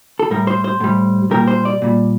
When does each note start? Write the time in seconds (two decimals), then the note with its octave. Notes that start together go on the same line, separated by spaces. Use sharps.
0.19 A4
0.30 A2 G3 A#4
0.47 C5
0.64 C5
0.80 A2 G3
1.31 A#2 G3 A#4
1.48 C5
1.65 D5
1.82 A#2 G3